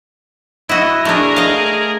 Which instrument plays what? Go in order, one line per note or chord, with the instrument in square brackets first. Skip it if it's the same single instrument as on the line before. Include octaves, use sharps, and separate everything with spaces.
[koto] E4 F#4 [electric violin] D#5
[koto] A3 D4 [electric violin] G#4 A#4
[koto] D#5 F5